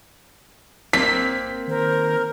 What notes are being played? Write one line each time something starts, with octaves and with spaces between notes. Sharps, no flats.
G#1 A#3 C4 B6
D#3 A#4 C5